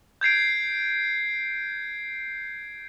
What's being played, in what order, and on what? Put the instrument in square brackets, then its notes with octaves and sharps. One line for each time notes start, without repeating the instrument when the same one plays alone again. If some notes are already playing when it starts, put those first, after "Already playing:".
[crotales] G6 G#6 C7 D7